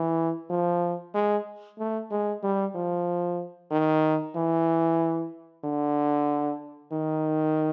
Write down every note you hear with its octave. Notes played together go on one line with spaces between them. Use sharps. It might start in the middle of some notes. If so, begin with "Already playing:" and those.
Already playing: E3
F3
G#3
A3
G#3
G3
F3
D#3
E3
D3
D#3